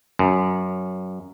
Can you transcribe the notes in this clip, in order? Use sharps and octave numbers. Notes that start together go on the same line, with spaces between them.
F#2